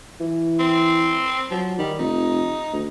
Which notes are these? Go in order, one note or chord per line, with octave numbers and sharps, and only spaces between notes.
E3
C4
F3 F#3
D#3 G3
F1 D#4
D2